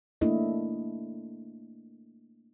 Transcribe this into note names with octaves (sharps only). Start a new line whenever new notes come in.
A3 A#3 D4 E4 A4 D#5